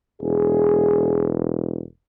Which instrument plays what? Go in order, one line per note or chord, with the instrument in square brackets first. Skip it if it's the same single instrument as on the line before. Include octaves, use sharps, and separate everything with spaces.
[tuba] E1 [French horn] G#4